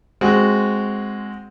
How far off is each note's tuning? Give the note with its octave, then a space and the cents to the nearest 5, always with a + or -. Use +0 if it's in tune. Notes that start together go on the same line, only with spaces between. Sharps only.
G#3 +0 C4 +0 F#4 +0